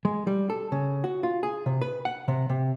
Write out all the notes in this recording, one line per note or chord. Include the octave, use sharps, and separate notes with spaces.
G#3
G3
A4
C#3
F#4
F4
G#4
C3
B4
F#5
C3
C3